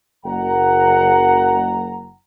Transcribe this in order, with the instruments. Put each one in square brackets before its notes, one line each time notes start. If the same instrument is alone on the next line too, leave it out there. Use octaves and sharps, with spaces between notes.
[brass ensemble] F#1 F#5 A#5